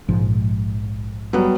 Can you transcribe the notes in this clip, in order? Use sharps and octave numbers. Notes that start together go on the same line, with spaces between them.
A#1 G#2 F3
F#3 G3 B3